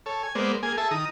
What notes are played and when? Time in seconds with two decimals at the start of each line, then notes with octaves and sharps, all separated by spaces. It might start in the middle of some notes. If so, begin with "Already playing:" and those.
0.06 A4 C#5
0.23 G#5
0.35 G#3 A#3 B3 C5 D5
0.63 A#3 G#4 G#5
0.78 G#4 A4 E5 A5
0.91 D#3 A#5 D#6